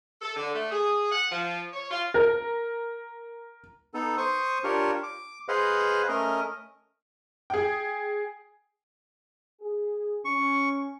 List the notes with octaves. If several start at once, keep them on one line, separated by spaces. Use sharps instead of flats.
A4
D3
A3
G#4
F#5
F3
C#5
F4
A#4
B3 D#4 A4
C5 C#6 D#6
D4 F4 G4 A#4 C#5
D6
G#4 B4 C5 D#5 F5 F#5
A3 C#4 A#4 D#5
G#4 G5
G#4
C#4 C#6